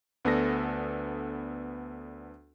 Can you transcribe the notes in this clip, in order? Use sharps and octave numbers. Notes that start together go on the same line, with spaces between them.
D2 B3 D4 A4 A#6